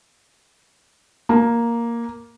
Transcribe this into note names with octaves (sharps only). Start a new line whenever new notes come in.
A#3